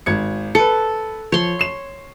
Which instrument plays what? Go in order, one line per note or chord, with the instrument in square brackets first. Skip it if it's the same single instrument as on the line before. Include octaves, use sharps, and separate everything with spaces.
[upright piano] G#1 G#6 C#7
[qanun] A4 [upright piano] B4 C#7
[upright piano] F3 [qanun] C#5 C6
[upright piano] C7 E7